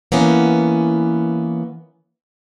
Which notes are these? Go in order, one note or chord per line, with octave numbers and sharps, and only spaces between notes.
E3 A#3 B3 C#4